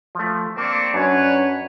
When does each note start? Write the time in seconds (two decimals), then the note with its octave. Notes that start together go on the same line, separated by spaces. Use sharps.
0.15 F3 A3
0.57 A#3 C4 D4 G5 C#6
0.94 F#2 F#3 C#4 D4 B4 C#5